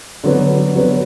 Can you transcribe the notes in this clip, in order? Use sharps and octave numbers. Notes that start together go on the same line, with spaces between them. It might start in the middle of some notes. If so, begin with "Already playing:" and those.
D3 F#3 B3
D3 F#3 B3